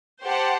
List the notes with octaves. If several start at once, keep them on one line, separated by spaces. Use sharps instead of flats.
G4 C5 F#5 A5